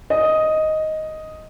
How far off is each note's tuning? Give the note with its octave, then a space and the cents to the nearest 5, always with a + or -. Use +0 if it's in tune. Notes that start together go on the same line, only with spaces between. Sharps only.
D#5 +5